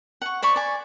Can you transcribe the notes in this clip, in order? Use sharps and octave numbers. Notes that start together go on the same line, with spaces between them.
F#5 C#6
C5 D5 B5 C#6
D5 G#5